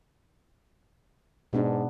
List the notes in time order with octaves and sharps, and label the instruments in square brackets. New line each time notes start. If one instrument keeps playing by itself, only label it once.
[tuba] G#2 [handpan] B2 B3 D4